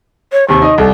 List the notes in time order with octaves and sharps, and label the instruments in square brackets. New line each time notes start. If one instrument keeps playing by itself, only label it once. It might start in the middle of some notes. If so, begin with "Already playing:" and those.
[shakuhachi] C#5
[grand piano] D#2 C3 [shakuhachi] C#6
[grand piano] D#4 D#5
[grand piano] C2 [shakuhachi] A4